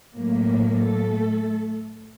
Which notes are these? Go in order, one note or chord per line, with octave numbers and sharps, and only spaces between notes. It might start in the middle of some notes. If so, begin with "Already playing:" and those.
A2 F#3 A#3
A3 A4